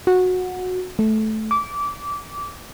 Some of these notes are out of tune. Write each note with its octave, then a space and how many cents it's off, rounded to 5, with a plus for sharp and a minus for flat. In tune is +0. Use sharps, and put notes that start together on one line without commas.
F#4 -15
A3 -15
D6 -20